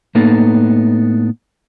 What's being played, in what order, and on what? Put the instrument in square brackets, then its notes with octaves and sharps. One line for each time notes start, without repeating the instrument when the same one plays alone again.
[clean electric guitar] A2 A#3 B3 D#4 A4